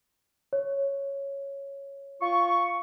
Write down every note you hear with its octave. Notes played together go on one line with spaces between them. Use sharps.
C#5
F4 C#6